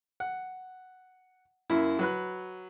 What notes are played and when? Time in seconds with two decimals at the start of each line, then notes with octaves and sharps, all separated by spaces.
0.20 F#5
1.70 F#2 A#3 E4
1.99 F#3 B4 F#6